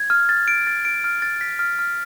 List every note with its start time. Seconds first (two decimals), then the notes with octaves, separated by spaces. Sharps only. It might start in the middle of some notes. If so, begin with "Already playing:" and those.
Already playing: G#6
0.10 F6
0.29 A6
0.48 D7
0.67 A6
0.85 D7
1.04 F6
1.22 A6
1.41 B6
1.59 F6
1.79 F6